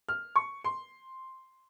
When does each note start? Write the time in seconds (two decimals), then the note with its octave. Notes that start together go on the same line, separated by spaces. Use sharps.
0.09 F6
0.36 C#6
0.64 C6